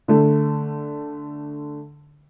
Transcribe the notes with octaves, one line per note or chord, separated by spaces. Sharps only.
D3 A3